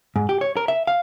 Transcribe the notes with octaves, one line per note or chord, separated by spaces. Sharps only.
G#2
G4
C#5
A#4
E5
F5